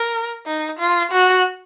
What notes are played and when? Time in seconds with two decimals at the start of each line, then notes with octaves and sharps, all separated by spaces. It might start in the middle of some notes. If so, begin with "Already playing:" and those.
Already playing: A#4
0.47 D#4
0.79 F4
1.12 F#4